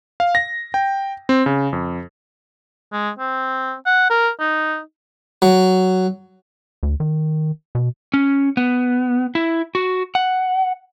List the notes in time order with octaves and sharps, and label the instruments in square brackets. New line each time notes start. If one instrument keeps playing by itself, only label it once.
[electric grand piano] F5
A#6
G5
C4
C#3
F2
[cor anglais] G#3
C4
F#5
A#4
D#4
[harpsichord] F#3
[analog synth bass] D2
D#3
B2
[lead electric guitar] C#4
B3
E4
F#4
F#5